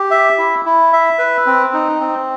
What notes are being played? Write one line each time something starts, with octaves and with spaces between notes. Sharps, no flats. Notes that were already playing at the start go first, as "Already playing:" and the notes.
Already playing: G4
E5
E4
E4
E5
B4
C4
D#4
C4